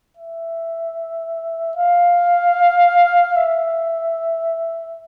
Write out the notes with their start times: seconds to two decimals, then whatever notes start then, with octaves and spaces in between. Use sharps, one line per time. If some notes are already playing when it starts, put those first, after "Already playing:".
0.17 E5
1.77 F5
3.36 E5